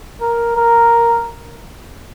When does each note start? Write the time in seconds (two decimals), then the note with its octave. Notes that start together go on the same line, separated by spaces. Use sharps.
0.21 A#4
0.56 A#4